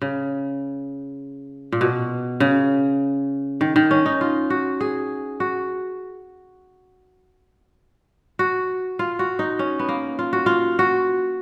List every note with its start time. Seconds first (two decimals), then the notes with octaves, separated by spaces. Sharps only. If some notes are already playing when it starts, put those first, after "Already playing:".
0.02 C#3
1.72 A#2
1.81 B2
2.40 C#3
3.61 D#3
3.76 D#3
3.91 C#4
4.06 D#4
4.21 F4
4.50 F#4
4.81 G#4
5.40 F#4
8.39 F#4
8.99 F4
9.19 F#4
9.39 D#4
9.59 C#4
9.79 B3
9.89 A#3
10.19 F4
10.33 F#4
10.46 F4
10.79 F#4